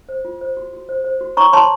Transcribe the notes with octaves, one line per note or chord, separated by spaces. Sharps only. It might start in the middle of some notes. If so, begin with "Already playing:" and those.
C5
F4
C5
F#4
F#4
C5
C5
F#4
C#5 A#5 C#6
C#5 A5 C6